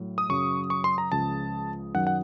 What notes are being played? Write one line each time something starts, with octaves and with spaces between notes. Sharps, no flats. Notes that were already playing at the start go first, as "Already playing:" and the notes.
Already playing: A2 F#3
D#6
F#2 C#3 F#3 C#6
C#6
C6
A#5
C#2 C#3 F3 A5
F#2 D#3 F#3 F#5
F#5